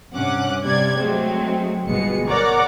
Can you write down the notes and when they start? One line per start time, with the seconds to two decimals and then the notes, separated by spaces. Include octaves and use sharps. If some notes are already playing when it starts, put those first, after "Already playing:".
0.14 G2 C3 C#4 F#5 D6 F#6
0.65 C3 G3 D5 G#6
0.98 F#3 G#3 A3 C4
1.87 G1 B2 G#3 B3 C#7
2.28 A#4 C#5 D5 F#5 A#5 D6